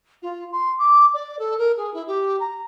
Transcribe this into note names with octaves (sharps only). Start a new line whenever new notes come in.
F4
C6
D6
D5
A4
A#4
G#4
E4
G4
A#5